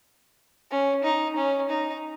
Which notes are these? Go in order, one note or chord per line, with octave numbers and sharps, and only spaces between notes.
C#4
D#4
C#4
D#4